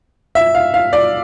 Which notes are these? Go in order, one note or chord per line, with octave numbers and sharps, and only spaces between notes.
E5
F5
F5
D5